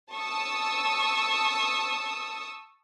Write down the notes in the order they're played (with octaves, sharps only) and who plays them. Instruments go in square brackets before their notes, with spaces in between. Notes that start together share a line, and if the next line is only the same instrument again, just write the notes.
[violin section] A5 C#6 D#6 E6